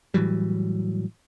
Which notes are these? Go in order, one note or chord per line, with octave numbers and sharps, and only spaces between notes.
A2 E3 F#3 G3